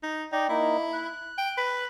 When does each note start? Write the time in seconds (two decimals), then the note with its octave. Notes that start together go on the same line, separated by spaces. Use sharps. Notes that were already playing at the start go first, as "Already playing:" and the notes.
0.03 D#4
0.33 D#4 D5 G5
0.49 A#3 D#4 E4
0.93 F#6
1.38 G5
1.57 B4